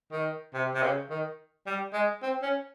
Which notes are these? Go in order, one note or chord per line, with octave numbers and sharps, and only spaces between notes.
D#3
C3
C3
C#3
D#3
G3
G#3
C4
C#4